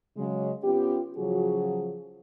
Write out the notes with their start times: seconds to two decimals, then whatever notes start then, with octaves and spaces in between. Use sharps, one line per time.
0.17 C#3 F#3 G#3
0.64 B3 C#4 F4 G4
1.18 C#3 F3 F#3 F#4 G#4